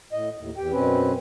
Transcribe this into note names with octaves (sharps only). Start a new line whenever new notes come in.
A2 D#5
D#2 A2
E2 G4 G5
F#2 B2 C4 C#4 B4